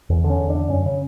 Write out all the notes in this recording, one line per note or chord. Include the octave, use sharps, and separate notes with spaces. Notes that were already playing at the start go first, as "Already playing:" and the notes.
E2
D3
C#4
E2
D3 D4
F#2 C#4
C#3